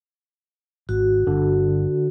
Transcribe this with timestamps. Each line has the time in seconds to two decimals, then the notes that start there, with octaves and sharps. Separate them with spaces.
0.89 G#1 F#4
1.27 G1 D3